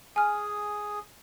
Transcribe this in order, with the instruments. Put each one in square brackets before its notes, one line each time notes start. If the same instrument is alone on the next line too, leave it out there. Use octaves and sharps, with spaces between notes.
[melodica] G#4 [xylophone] G#5 F6